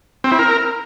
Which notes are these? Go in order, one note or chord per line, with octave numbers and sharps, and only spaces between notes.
C4
E4
A#4